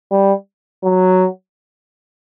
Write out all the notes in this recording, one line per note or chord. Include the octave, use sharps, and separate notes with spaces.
G3
F#3